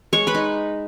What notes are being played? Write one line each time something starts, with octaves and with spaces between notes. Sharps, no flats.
G#3 C#5 C#6
B4 B5
D#4